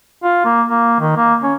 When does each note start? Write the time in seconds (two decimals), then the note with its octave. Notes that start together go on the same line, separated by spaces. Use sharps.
0.23 F4
0.45 A#3
0.69 A#3
1.00 D#3
1.16 A#3
1.43 C#4